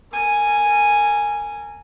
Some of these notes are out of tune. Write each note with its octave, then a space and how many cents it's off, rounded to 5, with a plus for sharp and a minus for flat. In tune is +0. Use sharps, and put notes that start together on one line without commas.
A#4 -35 G#5 +0